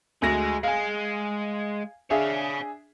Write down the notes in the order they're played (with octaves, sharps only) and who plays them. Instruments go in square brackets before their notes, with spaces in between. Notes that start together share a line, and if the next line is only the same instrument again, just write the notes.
[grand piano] D2 F#4 A#6 [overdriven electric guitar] G#3 G#4
[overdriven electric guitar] G#3 [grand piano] F5 G#5
[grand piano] D4 G#4 E5 [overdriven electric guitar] C#5 F5